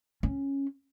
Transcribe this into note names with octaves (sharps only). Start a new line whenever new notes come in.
C#4